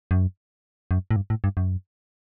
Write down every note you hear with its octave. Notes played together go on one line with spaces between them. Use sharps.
F#2
F#2
A2
G2
A2
G2
F#2